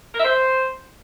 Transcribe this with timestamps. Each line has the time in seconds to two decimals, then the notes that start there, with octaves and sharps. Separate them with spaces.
0.14 A#4
0.19 E5
0.24 C5